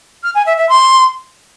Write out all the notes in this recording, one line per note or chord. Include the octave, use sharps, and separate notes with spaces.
F6
G#5
E5
E5
C6